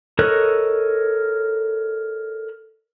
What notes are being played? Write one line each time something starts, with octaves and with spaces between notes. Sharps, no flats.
A4 A#4 C#5 D#5 F#6